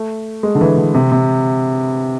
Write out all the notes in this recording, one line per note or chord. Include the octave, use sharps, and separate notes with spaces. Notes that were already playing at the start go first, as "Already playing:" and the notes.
Already playing: A3
G#3
D3
E3
D3
C3
C3